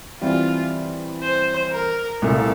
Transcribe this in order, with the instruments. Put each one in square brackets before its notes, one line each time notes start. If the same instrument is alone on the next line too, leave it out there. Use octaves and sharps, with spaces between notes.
[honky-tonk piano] E3 G3 C4 [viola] F4
[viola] C5
A#4
[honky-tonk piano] C2 A#2 A3 [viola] A4